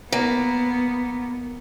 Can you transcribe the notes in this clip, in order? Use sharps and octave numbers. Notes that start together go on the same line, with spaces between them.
A#3 B3